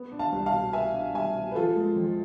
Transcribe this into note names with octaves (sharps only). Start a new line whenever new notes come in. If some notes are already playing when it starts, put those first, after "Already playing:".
Already playing: B3
D4
F5 A5
C2
F5 A5
B2
B3 E5 G#5
D4
C2 E5 G#5
B2
B4
F3 F4 A4
G#3
F2